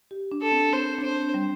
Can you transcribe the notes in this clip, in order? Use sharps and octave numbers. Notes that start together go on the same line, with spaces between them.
G4
D4
A4
C4
C4 C5
D4
C4 C5
G3